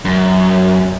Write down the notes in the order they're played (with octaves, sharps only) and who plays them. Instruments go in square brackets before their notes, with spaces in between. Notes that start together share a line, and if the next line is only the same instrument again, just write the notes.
[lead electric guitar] F#2